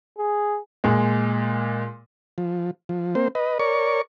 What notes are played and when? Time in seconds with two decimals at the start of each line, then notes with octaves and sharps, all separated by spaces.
0.18 G#4
0.84 A#2 G#3
2.38 F3
2.89 F3
3.15 A#3 C4 C5
3.35 B4 D#5
3.59 A#4 C#5 D5 C#6